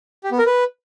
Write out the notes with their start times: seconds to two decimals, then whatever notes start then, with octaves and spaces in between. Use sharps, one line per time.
0.24 G4
0.31 B3
0.39 A#4
0.46 B4